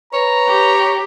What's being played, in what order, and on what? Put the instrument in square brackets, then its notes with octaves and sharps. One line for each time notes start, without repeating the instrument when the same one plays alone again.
[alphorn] B4 [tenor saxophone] C#5 [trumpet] A#5
[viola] G4